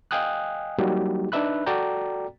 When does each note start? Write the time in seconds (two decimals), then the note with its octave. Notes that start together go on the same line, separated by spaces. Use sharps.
0.11 D#5 F5 G5 G#5 D#6 F#6
0.78 F#3 G3 A#3 D#4 F#4 G4
1.32 D4 D#4 B4 E5 B5 F#6
1.66 F#4 A4 D5 G5 A#5